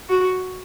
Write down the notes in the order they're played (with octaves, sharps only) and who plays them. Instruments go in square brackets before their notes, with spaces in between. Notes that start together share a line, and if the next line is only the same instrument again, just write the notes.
[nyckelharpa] F#4